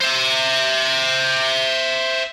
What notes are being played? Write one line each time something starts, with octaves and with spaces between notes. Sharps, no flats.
C5 E5